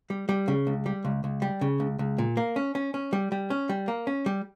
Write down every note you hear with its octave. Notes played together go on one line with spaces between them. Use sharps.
G3
G3
C#3
C#2
G3
C#2
C#2
G3
C#3
C#2
C#2
A#2
A#3
C#4
C#4
C#4
G3
G3
C#4
G3
A#3
C#4
G3